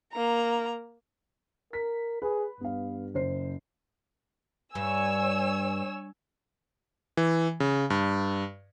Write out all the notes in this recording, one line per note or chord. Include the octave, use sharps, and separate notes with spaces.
A#3 A#5
A#4 B6
G#4 B4
G2 B3 F5
F#1 C5 C7
G2 C#5 G#5 E6
E3
C#3
G2